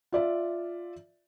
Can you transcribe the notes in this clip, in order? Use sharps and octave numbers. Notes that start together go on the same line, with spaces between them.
F4 D5 E5